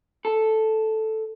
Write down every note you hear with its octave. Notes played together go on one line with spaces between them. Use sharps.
A4